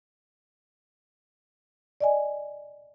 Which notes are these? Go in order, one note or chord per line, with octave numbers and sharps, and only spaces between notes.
D5 D#5 G#5